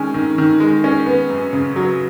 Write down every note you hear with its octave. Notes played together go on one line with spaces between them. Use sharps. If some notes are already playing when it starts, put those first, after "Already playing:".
Already playing: D#3 G#3 C#4
D#3
D#3
G#3
C#4
B3
F#2
C#3
F#3